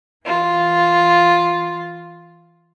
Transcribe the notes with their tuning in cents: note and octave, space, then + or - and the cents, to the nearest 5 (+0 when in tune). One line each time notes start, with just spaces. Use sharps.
E3 +0 F4 +0